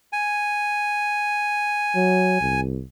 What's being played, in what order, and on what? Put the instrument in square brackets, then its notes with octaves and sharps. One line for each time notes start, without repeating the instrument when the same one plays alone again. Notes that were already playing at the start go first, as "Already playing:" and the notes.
[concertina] G#5
[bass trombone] F#3
C2